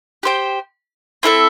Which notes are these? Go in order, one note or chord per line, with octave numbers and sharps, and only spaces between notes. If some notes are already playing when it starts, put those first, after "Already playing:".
G4 C5 G5
C4 E4 A4 E5